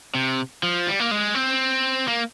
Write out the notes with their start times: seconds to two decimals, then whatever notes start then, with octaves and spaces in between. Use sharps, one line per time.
0.15 C3
0.63 F3
0.87 G3
1.00 A#3
1.11 G#3
1.35 C4
2.08 A#3